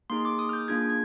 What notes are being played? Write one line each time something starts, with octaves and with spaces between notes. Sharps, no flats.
A#3 D#4 G#4 C6
D6
D#6
F6
G6
A#3 D4 F4 G#4 G#6
G#6